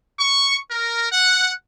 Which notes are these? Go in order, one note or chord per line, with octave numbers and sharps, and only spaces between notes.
C#6
A#4
F#5